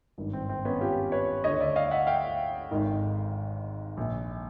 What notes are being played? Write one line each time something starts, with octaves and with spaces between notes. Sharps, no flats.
G#1 G2 D#3
C4
C4
B3 C#4
F4 G4
B4 C#5
D2 D3 C#5 D#5
D5 E5
D#5 F5
E5 F#5
F5 G5
G#1 G#2 D#3
A#1 A#2